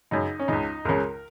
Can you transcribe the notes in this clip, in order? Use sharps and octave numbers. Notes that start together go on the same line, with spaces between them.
F#2 C#3 D#4
C#4
C#2 C#3 D#4
C#2 C#3 A#4